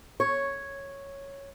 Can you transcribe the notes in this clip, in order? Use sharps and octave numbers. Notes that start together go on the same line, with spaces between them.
C#5